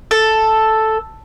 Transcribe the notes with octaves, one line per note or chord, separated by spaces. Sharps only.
A4